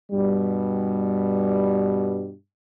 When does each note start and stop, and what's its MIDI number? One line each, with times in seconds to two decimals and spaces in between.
0.11 2.32 43
0.11 2.32 47
0.11 2.32 55